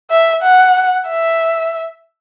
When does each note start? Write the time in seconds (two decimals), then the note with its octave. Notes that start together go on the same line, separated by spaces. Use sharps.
0.11 E5
0.43 F#5
1.09 E5